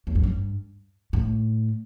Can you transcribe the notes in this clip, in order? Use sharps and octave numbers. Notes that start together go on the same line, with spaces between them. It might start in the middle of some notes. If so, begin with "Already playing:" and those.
E2
F#2
G2
A2